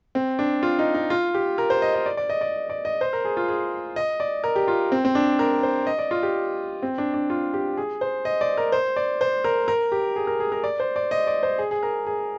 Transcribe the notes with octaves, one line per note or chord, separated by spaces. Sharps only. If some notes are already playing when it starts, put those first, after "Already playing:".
C4
D4
F4
D#4
D#4
F4
G4
A#4
C5
D#5
D#5
D5
D5
D#5
D5
D5
D#5
C5
A#4
G#4
F4
G#4
D#5
D5
A#4
G4
F4
C4
C4
D4
A#4
C5
D#5
D5
F4
G4
C4
D4
D4
F4
G4
G#4
C5
D#5
D5
A#4
C5
D5
C5
A#4
A#4
G4
G#4
A#4
G#4
A#4
D5
C5
D5
D#5
D5
C5
G#4
G#4
A#4
G#4